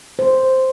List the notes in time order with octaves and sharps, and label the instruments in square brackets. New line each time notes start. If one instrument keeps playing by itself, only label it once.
[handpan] C5